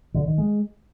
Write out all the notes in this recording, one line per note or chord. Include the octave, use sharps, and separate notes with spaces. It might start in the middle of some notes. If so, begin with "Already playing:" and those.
D3
D#3
G#3